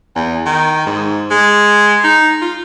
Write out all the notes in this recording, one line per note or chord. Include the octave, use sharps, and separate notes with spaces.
E2
D#3
G#2
G#3
D#4
F4